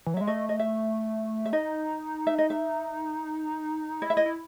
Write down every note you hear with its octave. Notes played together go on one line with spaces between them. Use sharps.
E3
F#3
G#3 E5
A3 D#5
D#5
E5
E5
D#4 D#5
E5
D#5
E5
E4 D#5
E5
D#5
E4